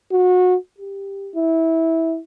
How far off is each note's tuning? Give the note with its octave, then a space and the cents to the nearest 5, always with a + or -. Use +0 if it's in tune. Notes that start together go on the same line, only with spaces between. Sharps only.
F#4 -25
G4 +10
E4 -15